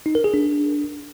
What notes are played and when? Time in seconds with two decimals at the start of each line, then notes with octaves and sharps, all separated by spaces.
0.06 D#4
0.15 A#4
0.24 G#4
0.34 D4